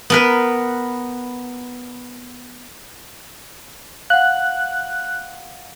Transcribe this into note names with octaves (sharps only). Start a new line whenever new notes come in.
B3 A#4 B4
F5 F#5 F#6